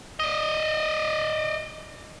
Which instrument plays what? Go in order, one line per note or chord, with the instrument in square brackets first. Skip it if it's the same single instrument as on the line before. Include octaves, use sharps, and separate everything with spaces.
[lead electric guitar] D5 D#5